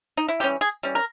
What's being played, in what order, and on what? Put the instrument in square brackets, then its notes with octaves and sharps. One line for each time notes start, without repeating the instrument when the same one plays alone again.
[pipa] D#4
E4
E3 G3 C#4 G4
G#4
E3 G3 C#4
A#4